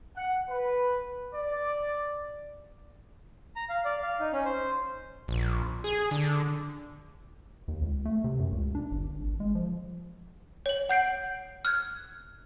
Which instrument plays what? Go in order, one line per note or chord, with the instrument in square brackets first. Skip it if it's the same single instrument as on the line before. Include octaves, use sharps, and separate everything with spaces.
[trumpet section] F#5
B4
D5
[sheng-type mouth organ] A#5
F5
D5
F5
D#4
C#4
C5
[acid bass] A#1
G#4
D3
[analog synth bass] D#2
C#2
A3
C3
F#2
C#2
D4
G1
G#1
G#3
F3
[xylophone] C#5 F#7
F#5 G6 C7 D7
F6 F#6 G#6